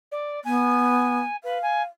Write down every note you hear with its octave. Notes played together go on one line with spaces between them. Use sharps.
D5
B3 G#5
B4 F5
G#5